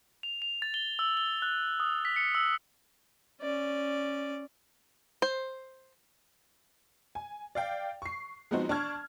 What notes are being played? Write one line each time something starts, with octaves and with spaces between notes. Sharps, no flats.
F7
F7
A6
G7
E6
G7
F#6
D#6
B6
C#7
E6
C#4 D5
C5
G#5
D5 F5 G5
C#6 C7
F3 G#3 B3 C4 D#4 F#4
D4 A5 C#6 F6 G#6